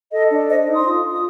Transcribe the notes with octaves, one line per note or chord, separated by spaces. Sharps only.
A4 D#5
D4
C5 D#5
D#4
C6 D#6
F4
F4
D#6